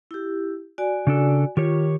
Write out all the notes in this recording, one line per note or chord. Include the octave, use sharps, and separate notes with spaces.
E4 G4
F#4 D5 G#5
C#3 D4 A4
D#3 F4 G4 C#5